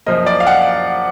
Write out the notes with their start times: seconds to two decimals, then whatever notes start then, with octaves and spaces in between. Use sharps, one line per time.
0.06 F#2 F3 A#3 D#5
0.26 D5
0.40 F5
0.47 F#5